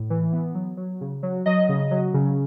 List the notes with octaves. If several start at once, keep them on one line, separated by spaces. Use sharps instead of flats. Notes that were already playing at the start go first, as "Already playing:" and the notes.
Already playing: A2
E3
B3
F#3
F#3
C#3
F#3
F#3 D#5
C#3
F#3
C#3